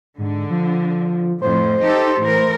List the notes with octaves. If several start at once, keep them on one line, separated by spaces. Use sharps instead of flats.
G#2 D3
F3
F2 A2 C5
D#4 G4 A4
A2 E3 A#4